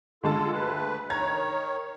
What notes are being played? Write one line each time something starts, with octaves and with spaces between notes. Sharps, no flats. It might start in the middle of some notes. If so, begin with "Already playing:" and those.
D3 G#3 F4 A4 A5
D2 B4
D#3 C#5 A#5 G#6